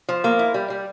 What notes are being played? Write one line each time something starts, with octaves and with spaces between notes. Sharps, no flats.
F3
A#3
E4
G3
G3